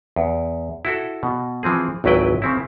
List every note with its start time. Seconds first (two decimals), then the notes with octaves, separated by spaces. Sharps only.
0.16 E2
0.85 E4 F#4 A4
1.23 B2
1.63 E3 F3 C4 G#4
2.04 G#1 C#2 F#3 E4 B4 G5
2.42 C#3 C4 E4